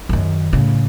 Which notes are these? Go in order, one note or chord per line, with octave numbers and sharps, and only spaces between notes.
F#2 D#3
A2 C#3